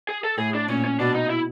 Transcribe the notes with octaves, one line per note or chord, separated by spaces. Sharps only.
G#4
A4
A2 G#4
D4
A#2 C#4
C#4
B2 D4
D#4
E4